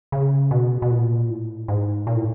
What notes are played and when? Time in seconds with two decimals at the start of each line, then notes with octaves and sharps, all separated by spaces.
0.12 C#3
0.51 B2
0.82 B2
0.91 A#2
1.29 A2
1.68 G#2
2.07 A#2
2.16 A2